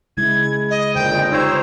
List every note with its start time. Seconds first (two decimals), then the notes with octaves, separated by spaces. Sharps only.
0.17 C#3 G#3 E4 G#6
0.70 D#5
0.95 F2 A#2 D3 C5 G5
1.10 F4 C5 D#5
1.32 D#4 G4 C5 C#5 E6